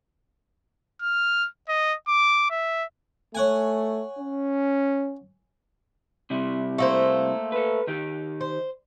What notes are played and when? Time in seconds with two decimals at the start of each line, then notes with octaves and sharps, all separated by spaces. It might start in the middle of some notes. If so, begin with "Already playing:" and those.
1.02 F6
1.69 D#5
2.08 D6
2.50 E5
3.35 A3 C#5 F#5 G#5
4.19 C#4
6.30 C3 G3 E4
6.78 A3 A#3 C5
7.52 A4 B4
7.87 D#3 D#4 G4
8.41 C5